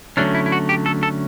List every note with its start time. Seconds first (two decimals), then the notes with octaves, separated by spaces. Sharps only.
0.17 D3 F#3 A3 C#4 D4
0.34 E4
0.46 E4
0.52 F#4
0.69 G4
0.86 A4
1.03 A4